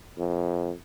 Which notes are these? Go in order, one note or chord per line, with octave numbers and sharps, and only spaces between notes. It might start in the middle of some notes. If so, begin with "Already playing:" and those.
F2